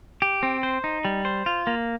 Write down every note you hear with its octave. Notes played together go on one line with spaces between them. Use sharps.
G4
C4
C5
D#4
G3
C5
F4
A#3